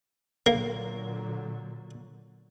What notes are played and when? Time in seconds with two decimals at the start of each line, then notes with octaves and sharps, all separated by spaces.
0.46 A#2 D3 F#3 A#3